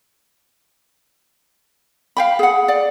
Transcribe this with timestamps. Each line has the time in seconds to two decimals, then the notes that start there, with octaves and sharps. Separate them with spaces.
2.17 F5 G5 B5
2.39 G#4 F#5
2.68 D5